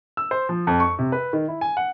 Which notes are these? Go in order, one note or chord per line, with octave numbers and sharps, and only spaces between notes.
E6
C5
F3
F2
C#6
C3
B4
D#3
E4
G#5
F#5